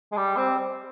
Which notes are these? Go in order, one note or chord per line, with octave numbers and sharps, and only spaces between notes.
G#3
G3
C4